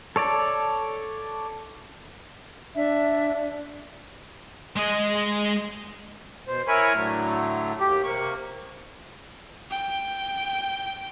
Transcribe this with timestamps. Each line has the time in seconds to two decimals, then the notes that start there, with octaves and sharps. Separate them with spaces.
0.16 A4 C#5 D5 A5
2.75 D4 E5
4.77 G#3 D#5
6.47 B2 C5
6.68 E4 A#4 C#5 G#5 B5 C#6
6.95 A2 D3 F#3 A3
7.80 D#2 G4
8.04 C3 A#3 C#6
9.71 G5